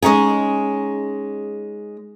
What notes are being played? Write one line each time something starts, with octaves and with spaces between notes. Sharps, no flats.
G#3 C#4 D#4 G#4